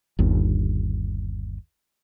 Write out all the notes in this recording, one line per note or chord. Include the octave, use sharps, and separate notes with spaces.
G1 D#2